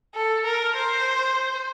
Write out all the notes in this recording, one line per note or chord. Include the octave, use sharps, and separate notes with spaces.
A4
A#4
C5